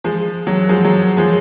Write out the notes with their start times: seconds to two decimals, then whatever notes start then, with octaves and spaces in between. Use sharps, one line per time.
0.04 F3 G#3
0.47 F#3
0.69 F3 G#3
0.85 F#3
1.17 F3 G#3